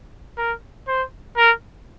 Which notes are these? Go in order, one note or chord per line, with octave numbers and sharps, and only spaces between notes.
A#4
C5
A#4